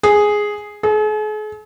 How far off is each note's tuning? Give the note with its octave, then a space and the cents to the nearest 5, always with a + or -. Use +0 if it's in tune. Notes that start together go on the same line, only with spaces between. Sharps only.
G#4 +0
G#4 +45